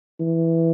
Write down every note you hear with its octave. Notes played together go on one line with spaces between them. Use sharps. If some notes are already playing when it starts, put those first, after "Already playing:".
E3